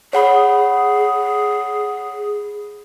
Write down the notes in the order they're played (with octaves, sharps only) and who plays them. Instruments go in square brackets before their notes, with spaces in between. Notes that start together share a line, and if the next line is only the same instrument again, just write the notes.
[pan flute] G#4 [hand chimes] C#5 F#5 B5